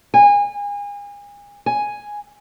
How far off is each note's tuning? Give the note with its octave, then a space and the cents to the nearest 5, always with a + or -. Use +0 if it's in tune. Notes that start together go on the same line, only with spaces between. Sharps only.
G#5 -35
G#5 +0